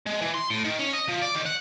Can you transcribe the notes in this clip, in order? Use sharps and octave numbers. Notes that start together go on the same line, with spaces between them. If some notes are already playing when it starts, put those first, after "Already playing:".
G#3
E3
C6
A2
D#3
C#4
D#5
F3
D5
D#3
F#5